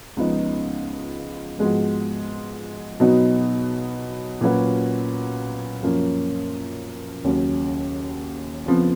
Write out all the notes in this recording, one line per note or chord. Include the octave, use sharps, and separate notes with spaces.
C#2 C#3 F3 B3 D#4
G#2 F3 G#3 B3 F#4
B2 F#3 B3 D#4
A#2 F#3 C#4 F#4 B4
F#2 F3 A#3 C#4
D#2 C#3 F#3 C#4
F2 C#3 F3 B3